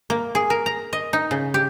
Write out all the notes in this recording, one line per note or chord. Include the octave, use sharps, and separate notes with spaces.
A#3
G#4
A#4
A#5
D#5
D#4
C#3
G4